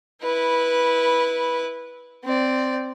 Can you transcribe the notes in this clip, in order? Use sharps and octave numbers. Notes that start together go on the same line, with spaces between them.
E4 B4
C4 D5